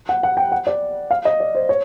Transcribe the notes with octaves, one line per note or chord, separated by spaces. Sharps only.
F#5
F#5
G5
F#5
D5
F5
D#5
D5
C5
C#5